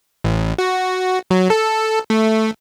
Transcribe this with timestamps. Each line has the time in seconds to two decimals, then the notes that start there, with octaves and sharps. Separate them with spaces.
0.24 A1
0.58 F#4
1.31 F#3
1.50 A4
2.10 A3